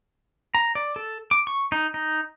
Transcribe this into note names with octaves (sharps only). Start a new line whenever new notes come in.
A#5
D5
A4
D6
C#6
D#4
D#4